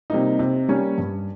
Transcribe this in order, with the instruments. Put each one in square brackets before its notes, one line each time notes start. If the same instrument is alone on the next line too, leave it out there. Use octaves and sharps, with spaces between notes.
[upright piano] C3 G3 A#3 D#4
C3
G3 A#3 C#4
G2